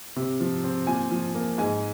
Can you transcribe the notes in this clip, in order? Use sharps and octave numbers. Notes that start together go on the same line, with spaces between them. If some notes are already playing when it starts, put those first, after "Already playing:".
C3
F3
C4
A#2 G#5
F3
A#3
G#2 G#5